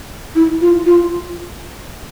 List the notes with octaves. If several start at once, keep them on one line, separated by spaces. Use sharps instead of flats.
E4
F4
F4